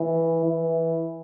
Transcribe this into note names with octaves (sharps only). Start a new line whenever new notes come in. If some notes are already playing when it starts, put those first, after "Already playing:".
Already playing: E3
E3